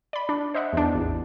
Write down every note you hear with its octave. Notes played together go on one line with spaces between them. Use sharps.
D5 B5
D4
C5 D#5 E5 F#5
E2 D4
A1 E2